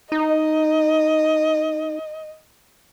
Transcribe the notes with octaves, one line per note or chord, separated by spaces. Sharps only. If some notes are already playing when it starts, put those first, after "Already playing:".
D#4 D#5